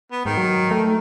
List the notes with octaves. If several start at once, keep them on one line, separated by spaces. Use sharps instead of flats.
B3
G#2 D#3
F#3
A3